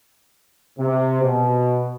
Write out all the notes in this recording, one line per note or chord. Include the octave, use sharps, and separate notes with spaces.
C3
B2